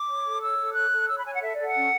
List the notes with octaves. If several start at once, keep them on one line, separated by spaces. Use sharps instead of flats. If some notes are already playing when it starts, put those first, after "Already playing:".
Already playing: D6
C#5
A4
C#5 E6
A4
C#5 F#6
A4
C#5 E6
B5
C#5 G#5
F#5
A4 E5
A4 D5
F#5
C#4